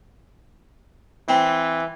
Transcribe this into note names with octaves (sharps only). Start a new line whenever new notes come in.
E3 C4